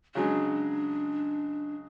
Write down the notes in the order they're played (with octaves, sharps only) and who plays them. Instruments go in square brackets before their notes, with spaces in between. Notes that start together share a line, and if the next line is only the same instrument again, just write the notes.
[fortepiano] C#3 F#3 G#3 [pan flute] D4